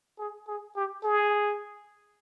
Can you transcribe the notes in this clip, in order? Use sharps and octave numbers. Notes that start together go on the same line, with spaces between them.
G#4
G#4
G4
G#4